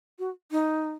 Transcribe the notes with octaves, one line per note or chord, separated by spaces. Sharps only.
F#4
D#4